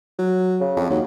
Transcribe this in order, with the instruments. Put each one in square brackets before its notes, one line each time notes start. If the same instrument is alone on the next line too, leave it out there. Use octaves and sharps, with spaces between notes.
[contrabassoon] F#3
[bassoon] C#3
[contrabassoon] F2
[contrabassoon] D#2 [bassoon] F#3